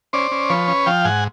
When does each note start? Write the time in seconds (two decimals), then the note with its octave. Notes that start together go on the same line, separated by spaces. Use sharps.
0.13 C#4 C5 D5
0.31 C#4
0.50 F3 B4 C#5
0.68 C#4
0.86 F3 F5 G5
1.05 G#2 F#5 G#5